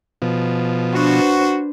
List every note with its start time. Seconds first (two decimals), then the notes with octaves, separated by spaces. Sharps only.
0.22 B2 F3
0.94 D4 F#4 B4 C5